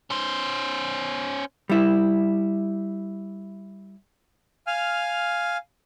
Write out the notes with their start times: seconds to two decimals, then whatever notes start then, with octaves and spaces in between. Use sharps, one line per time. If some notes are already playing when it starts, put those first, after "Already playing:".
0.10 C#4 C5
1.70 G3 E4
4.67 F5 G#5 F6